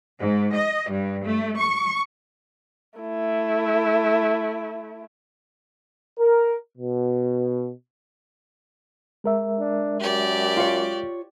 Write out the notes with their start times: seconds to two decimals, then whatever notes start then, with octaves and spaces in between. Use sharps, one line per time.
0.19 G#2
0.55 D#5
0.90 G2
1.24 A3
1.58 C#6
2.99 A3 E4
6.19 A#4
6.77 B2
9.24 G#3 A#4 E5
9.59 D4
10.00 F#2 G4 D5
10.57 F4 C#5